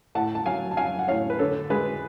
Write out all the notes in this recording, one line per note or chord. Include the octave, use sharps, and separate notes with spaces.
A2 F#5 A5
A5
F#3 F5 G#5
A5
F#3 F5 G#5
F#5
A2 C#5 F5
B4
D3 A4 C#5
G#3 G#4 B4